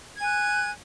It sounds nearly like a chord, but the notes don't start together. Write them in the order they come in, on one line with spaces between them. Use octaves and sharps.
G#6 G#5 F#6